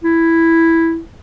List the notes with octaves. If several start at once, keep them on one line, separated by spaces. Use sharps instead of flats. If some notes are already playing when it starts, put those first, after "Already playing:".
E4